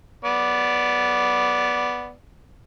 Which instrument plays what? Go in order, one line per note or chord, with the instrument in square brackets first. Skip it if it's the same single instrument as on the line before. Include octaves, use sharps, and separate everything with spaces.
[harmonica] B3 D5